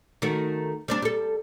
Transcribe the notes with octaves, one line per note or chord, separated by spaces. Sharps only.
D#3 A3 F#4
G3 C4 D4
G3 A4